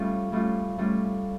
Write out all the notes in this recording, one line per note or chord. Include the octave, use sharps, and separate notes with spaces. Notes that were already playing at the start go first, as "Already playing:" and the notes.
Already playing: A2 G3 C#4 F4
A2 G3 C#4 F4
A2 G3 C#4 F4